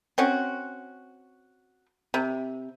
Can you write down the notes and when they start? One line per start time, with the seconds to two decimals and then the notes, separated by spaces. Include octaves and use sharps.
0.18 C4 C#4 F#4
2.14 C3